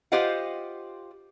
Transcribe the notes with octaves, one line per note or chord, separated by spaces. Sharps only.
F4 G4 C5 D#5 F5 F#5